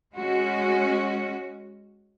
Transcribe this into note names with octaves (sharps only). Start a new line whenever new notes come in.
G#3 C#4 F#4